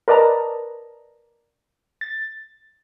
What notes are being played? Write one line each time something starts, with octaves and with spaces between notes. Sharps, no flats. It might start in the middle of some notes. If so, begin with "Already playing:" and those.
A#4 B4 D5 D#5 A5 A#5
A6